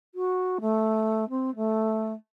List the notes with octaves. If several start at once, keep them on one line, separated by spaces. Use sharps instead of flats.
F#4
A3
C4
A3